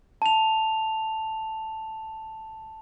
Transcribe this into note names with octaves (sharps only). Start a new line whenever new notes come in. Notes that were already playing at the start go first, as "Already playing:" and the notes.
A5 F7